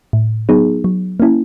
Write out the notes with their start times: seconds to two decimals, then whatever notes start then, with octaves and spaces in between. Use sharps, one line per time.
0.13 A2
0.49 F#3 B3 D#4 G#4
0.84 F#3
1.20 A#3 C#4 E4